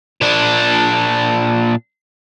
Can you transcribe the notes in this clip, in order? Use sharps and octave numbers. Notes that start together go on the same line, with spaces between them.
A#2 D4